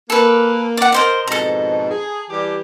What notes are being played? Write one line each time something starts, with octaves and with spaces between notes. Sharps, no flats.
A#3 A4 B4
D5 F#5
A#4 C5 D#5
F2 G#2 B2 A4 A#5
G#4
E3 G3 G4